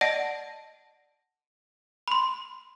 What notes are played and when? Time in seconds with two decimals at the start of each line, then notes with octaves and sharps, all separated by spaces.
0.01 D5 D#5 F#5 A5 A#6 D7
2.08 B5 C6